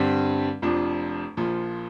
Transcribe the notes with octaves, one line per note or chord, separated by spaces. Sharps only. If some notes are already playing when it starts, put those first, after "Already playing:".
Already playing: G2 D3 G3 C4
F1 F2 F3 D4
A#1 A#2 F3